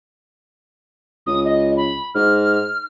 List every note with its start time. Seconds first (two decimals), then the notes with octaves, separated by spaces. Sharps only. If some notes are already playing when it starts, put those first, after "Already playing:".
1.27 C#2 D#6
1.45 D#5
1.77 B5
2.15 G#2 F6